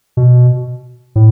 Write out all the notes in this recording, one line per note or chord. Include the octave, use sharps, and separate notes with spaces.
B2
A2